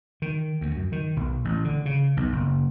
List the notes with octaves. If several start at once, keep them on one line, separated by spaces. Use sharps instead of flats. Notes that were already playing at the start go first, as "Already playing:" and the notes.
D#3
D2
F#2
D#3
B1
A1
D3
C#3
B1
F#1